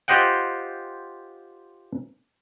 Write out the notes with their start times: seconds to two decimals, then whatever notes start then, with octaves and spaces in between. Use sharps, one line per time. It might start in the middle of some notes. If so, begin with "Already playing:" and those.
0.08 F4 G4 C5 D#5 F#5 G5